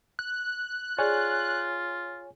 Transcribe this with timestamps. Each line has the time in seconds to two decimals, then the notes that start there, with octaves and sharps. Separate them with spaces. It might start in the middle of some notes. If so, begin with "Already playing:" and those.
0.19 F#6
0.99 F4 G#4 C#5 D5 G#5